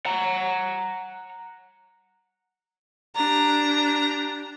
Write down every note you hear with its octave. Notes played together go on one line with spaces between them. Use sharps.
F#5 A#5
D4 G4 A#5